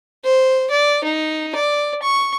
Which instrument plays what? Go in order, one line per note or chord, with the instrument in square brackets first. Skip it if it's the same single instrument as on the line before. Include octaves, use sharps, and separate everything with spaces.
[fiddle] C5
D5
D#4
D5
C#6